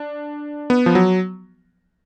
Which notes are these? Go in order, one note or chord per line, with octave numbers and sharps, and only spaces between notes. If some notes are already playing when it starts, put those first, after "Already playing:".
Already playing: D4
B3
F3
F#3